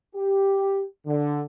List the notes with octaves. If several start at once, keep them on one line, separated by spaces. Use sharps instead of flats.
G4
D3